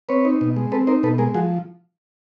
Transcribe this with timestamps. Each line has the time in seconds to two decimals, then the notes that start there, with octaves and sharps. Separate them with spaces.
0.09 C4 B4 C#5
0.25 D#4
0.41 B2
0.56 G#3
0.72 C4 A4 B4
0.87 D#4 A#4 C5
1.03 B2 A4 B4
1.18 G#3 G#4 A#4
1.34 F3 F#4 G#4